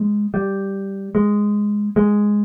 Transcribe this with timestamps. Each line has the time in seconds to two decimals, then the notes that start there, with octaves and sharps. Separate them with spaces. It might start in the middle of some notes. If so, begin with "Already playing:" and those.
Already playing: G#3
0.34 G3
1.15 G#3
1.96 G#3